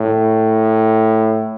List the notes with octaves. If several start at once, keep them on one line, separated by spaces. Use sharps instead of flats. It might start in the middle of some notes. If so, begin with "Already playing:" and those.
Already playing: A2